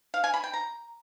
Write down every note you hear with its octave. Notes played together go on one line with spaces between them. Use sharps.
F5
G#5
B5
G5
A#5